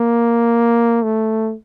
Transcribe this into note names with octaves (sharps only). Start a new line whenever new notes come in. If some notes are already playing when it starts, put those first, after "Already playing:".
Already playing: A#3
A3